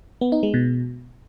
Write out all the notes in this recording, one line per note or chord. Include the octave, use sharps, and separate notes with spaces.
B3
D#4
G#3
B2